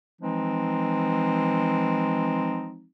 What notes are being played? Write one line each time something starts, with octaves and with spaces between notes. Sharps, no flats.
E3 F3 G#3 C4 D#4